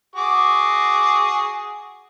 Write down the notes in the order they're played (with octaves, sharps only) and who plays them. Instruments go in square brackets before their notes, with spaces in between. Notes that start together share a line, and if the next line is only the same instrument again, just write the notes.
[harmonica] F#4 G#4 D6